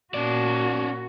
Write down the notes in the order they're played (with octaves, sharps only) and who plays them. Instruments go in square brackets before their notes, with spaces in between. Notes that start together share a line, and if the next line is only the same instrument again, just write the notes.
[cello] A#2 F#4 [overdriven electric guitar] C#4 D5